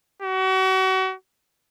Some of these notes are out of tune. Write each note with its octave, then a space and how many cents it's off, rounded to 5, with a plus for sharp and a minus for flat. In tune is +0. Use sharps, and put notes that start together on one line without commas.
F#4 +35